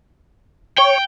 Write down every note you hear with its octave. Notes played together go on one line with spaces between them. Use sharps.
C#5 G5